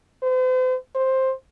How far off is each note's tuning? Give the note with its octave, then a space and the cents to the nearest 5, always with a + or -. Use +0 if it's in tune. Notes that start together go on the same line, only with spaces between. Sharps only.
C5 -40
C5 +10